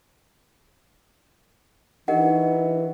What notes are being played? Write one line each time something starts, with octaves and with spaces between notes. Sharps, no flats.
E3 D4 D#4 G4 A#4 D#5 F#5